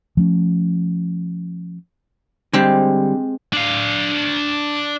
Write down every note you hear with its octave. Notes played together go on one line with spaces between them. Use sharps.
F3 A3 C#4
D3 G3 G#3 C4 G4
D4 F5